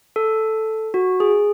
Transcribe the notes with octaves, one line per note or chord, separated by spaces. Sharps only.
A4
F#4
G#4